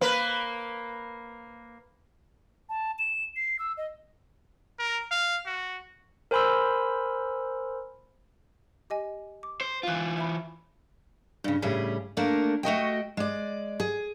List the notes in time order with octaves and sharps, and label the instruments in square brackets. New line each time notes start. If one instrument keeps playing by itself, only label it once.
[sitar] A#3 B4
[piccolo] A5
E7
C7
E6
D#5
[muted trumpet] A#4
F5
F#4
[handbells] A#4 C5 G#5 B5 C6 E6
[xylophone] G4 D#5 G#5
D6
[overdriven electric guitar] C5
[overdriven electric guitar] E3 F4 [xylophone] F5 F#6
[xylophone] E5 B5
[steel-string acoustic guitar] G2 C#3
A2 C#3 G3 G#4
A3 A#3 D4 A#4
A3 F#4 D#5 G5
G#3 D5
G#4